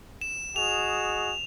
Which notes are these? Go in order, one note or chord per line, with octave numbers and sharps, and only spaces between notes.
E7
F#4 G#4 D#5 F7